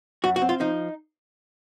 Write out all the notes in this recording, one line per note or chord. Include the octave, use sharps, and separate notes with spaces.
F#2 F#4
F#4
C4
F4
F3 D#4